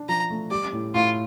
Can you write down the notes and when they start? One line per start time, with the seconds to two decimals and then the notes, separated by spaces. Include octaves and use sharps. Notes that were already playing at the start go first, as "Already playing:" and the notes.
Already playing: D4
0.09 F3 A#5
0.30 A3
0.51 G3 D5
0.73 A2
0.94 A2 F4